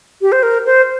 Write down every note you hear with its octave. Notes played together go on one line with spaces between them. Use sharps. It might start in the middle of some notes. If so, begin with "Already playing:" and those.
G4
C5
A#4
C5